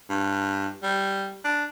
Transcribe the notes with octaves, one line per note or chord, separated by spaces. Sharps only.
G2
G3
D4